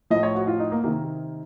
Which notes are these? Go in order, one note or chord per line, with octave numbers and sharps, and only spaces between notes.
A2 F3 D#5
C#5
F#4
F4
D#4
A#3
C3 D#3 A#3